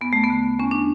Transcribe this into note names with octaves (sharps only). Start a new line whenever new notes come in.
E2 B3
A3
B3
D3
E2 C#4
D4